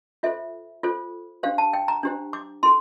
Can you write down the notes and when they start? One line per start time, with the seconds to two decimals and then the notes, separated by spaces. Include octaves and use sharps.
0.23 F4 A4 C5 E5
0.83 F4 A4 C5
1.43 D4 G4 C5 F5
1.58 A5
1.73 G5
1.88 A#5
2.03 D4 G4 C5
2.33 D6
2.63 E4 A4 C6